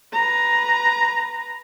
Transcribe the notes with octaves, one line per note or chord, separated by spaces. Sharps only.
B4 A#5